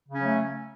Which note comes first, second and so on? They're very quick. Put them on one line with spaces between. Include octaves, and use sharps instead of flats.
C#3 C#4 F#3 A3